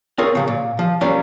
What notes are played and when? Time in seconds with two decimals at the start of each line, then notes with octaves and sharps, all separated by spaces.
0.18 C4 F4 G#4 A#4 C#5
0.35 C#3 F3 F#3
0.48 A#2
0.79 F3
1.01 F#3 G3 A#3 C#4 F4